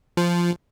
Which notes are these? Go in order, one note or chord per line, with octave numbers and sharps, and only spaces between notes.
F3